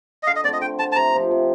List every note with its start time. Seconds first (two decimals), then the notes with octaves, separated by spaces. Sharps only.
0.23 D#5
0.27 D3 F5
0.36 D#5
0.44 C4 D5
0.48 A3
0.53 D#5
0.61 D3 G5
0.78 A3 C4 A5
0.92 A5
0.96 C3 A#5
1.14 F3 C4 G4
1.31 C3